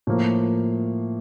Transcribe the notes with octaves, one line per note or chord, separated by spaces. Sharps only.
A2 F3 A#3